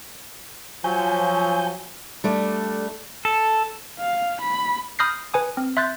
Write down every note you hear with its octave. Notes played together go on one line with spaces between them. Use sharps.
F3 F#3 G#5 G6
G3 A3 D4
A4
F5
B5
B5 D#6 F6 G6 A#6 C7
B4 G#5 D#6
C4
E5 C6 F#6 G6 A6